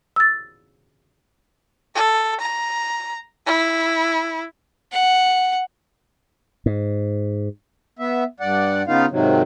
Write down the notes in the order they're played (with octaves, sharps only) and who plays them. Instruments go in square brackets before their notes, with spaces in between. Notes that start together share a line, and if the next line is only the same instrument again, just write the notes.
[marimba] E6 A6
[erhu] A4
A#5
E4
[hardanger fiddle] F#5
[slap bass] G#2
[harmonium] B3 E5
G2 D5 F#5
C#3 B3 D#4 F4 F5
G#2 C3 D#3 F#3